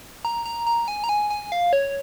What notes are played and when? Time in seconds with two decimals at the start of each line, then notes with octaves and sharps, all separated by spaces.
0.25 A#5
0.46 A#5
0.67 A#5
0.88 G#5
1.04 A#5
1.09 G#5
1.31 G#5
1.52 F5
1.73 C#5